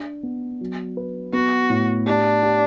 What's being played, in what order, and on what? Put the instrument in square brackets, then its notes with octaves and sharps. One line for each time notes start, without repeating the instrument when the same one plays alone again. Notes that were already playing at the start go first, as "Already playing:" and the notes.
Already playing: [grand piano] D4
B3
F#3
B4
[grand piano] B3 [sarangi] F#4
[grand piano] A2
[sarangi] D4 [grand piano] G4
[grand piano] G4